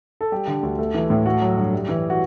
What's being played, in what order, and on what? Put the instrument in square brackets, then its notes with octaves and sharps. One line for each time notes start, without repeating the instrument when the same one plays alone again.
[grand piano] A4
G3 G4
D3
D2
A3
E3
A2
A3 F#4
F#3
G2
G3
E3
F#4